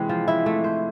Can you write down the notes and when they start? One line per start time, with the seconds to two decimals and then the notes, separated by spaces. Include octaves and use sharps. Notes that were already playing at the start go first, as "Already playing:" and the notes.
Already playing: C3 E3 G#3 C4
0.09 F3
0.28 E4
0.46 A3
0.64 C5